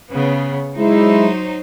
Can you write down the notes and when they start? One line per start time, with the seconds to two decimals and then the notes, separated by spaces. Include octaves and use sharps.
0.12 C#3 B3
0.79 F#3 G#3 D#4 E4 C5